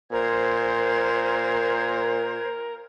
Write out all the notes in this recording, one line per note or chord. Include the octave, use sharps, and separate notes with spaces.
A#2 A#4 C5 G#6